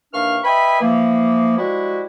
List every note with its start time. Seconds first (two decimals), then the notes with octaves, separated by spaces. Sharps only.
0.13 D#2 E3 D4 F5 C#6 F6
0.44 B4 D#5 E5 G5 G#5 B5
0.80 E3 F3 A#3
1.57 F3 G3 G#3 E4 F#4